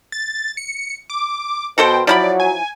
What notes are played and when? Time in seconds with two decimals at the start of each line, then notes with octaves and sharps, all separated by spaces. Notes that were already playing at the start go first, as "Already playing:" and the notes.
0.12 A6
0.57 C#7
1.10 D6
1.78 B2 F#4 A4 C5 G5
2.07 F3 F#3 E4 D5 B5
2.40 G#5